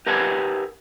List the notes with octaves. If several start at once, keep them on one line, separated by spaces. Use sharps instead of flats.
G4 A#4 B4 F#5 G#5 A5